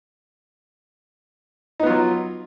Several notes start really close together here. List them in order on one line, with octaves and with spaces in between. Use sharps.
D#4 B3 F4 F#3